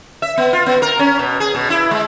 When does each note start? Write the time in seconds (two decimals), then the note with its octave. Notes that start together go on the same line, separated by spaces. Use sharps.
0.22 E5
0.37 B3
0.53 F4
0.66 B3
0.82 A#4
0.99 C#4
1.19 B2
1.40 G#4
1.55 B2
1.70 E4
1.91 G#3